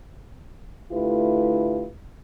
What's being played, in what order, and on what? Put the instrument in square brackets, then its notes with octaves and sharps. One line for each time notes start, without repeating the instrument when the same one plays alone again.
[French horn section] D3 A3 E4 F4 G4 B4